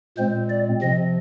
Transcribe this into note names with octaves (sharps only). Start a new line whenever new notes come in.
A#2 G#3 C4 C5
D5
C3 F3 C4 D#5